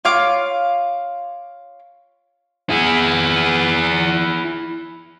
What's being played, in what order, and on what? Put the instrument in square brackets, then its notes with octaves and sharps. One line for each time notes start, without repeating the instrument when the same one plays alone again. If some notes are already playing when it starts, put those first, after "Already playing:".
[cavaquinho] F4 C#5 F5 D6
[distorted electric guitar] E4 G#4